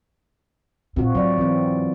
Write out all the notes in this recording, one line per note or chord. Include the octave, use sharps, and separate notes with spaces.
A#2 C4 F4 F#4
G#2 F#3 D5
E3 C4